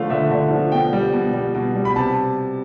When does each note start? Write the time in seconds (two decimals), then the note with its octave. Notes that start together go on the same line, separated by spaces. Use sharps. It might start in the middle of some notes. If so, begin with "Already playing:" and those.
Already playing: D3 F3 A3 F5
0.10 D3 E5
0.31 D3
0.51 F3
0.72 B2 G5
0.93 G3
1.13 B2
1.33 G3
1.55 B2
1.76 G3
1.85 B5
1.96 C3 A5